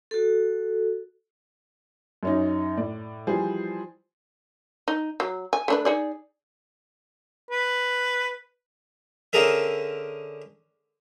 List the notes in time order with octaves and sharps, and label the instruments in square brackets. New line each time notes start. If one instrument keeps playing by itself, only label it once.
[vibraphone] F#4 A4
[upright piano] F#2 C#4 D#4
A2 D5
E3 F3 G3 G#4 C5
[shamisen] D#4
F#3
G#5
A3 D4 B4
D#4 G#4 D5
[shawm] B4
[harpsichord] D3 C#4 G#4 A#4 E5